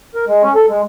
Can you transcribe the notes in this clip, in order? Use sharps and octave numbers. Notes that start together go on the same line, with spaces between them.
A#4
G#3
C#4
A4
G#3